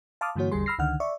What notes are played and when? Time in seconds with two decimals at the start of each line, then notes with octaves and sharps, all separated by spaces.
0.21 F5 A5 C6 D6 D#6 F6
0.36 G2 D3 E3 A#3 F#4 C#5
0.52 A1 E2 D3 G3 G#4 C6
0.66 B5 E6 F6 A#6 C7
0.79 C#2 D3 D#3 F#5 F6
1.00 D5 E5 C#6